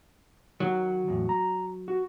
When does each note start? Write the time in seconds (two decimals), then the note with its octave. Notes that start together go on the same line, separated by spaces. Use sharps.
0.60 D#3 F#3
1.08 E2 A2
1.29 A#5
1.88 F#4